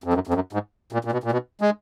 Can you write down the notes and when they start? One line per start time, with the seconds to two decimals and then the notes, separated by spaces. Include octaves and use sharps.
0.04 F2
0.13 F#2
0.27 F2
0.34 F#2
0.53 G#2
0.92 A#2
1.05 A#2
1.12 B2
1.24 A#2
1.32 B2
1.61 G#3